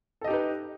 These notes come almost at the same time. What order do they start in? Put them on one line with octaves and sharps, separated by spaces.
A4 D#5 G4 D#4 B4